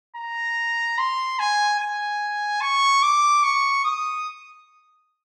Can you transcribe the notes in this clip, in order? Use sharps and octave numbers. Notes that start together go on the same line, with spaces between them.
A#5
C6
G#5
G#5
C#6
D6
C#6
D#6